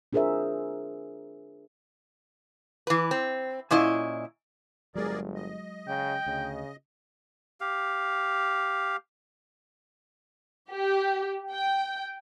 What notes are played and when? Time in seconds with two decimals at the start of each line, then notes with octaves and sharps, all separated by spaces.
0.13 D4 F4 G#4 A#4 C5 E5
2.87 E3 B4
3.11 C4
3.71 A#2 C#4 E4 D#5
4.95 G1 F#3 G#3 G#4 A#4 D5
5.35 D#5
5.88 C#3 G5
6.26 D2 C#3
7.61 G4 F5
10.71 G4
11.52 G5